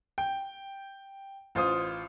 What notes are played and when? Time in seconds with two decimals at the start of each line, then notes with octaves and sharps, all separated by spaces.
0.18 G5
1.55 A1 F4 C5 D#6